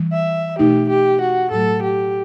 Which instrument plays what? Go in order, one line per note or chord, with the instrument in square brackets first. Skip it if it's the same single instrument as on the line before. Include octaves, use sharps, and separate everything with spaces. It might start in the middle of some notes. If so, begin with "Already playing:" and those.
Already playing: [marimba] E3 G3
[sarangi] E5
[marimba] B2 A3 D#4 [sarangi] G4
[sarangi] G4
F#4
[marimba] A2 F#3 A3 [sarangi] A4
[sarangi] G4